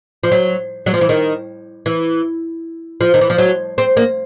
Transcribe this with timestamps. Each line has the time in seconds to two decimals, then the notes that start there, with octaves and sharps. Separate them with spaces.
0.23 F3
0.32 F#3
0.86 F#3
0.94 F3
1.01 E3
1.09 D#3
1.86 E3
3.01 F3
3.14 D#3
3.21 E3
3.30 F3
3.38 F#3
3.78 C4
3.97 A#3